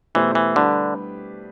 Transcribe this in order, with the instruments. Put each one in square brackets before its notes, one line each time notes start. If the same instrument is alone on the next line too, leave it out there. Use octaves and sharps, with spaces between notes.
[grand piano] B2 A3 E4 G4 C5 [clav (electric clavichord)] E3
[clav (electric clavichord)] E3
[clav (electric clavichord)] D3 [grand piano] G3 D4 G4 B4